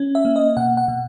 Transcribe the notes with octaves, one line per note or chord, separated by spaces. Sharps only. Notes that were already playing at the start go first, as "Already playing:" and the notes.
Already playing: C#4
E5
A#3
D#5
B2 F#5
F#5
B2